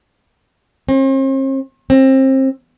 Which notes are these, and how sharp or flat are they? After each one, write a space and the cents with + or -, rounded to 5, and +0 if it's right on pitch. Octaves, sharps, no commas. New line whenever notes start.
C4 +45
C4 +25